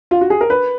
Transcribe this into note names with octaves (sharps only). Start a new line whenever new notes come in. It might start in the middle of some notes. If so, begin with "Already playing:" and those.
F4
F#4
G#4
A#4
B4